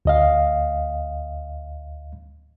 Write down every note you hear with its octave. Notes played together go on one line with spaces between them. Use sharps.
D2 D#5 F5